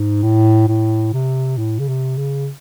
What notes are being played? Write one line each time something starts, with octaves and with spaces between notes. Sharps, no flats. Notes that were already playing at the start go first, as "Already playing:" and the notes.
Already playing: G#2
A2
A2
C3
A2
C#3
C3
C#3